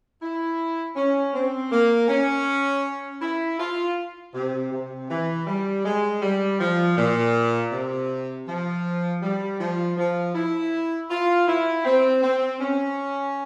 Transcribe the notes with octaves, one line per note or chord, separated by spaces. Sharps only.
E4
C#4
C4
A#3
C#4
E4
F4
C3
C3
E3
G3
G#3
G3
F3
A#2
C3
F3
G3
F3
F3
E4
F4
E4
C4
C4
C#4